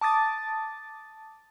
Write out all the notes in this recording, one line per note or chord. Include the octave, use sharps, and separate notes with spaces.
A5 D6 D#6 A6